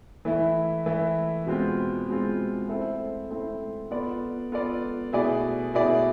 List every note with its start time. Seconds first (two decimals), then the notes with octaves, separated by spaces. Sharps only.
0.25 E3 A3 E4
0.86 E3 A3 E4
1.46 B2 G#3 C4 F4
2.08 B2 G#3 C4 F4
2.69 A3 C4 E4 A4 C5
3.30 A3 C4 E4 A4 C5
3.91 B3 F4 A4 D5
4.52 B3 F4 A4 D5
5.13 B2 A3 E4 G#4 D5
5.74 B2 A3 E4 G#4 D5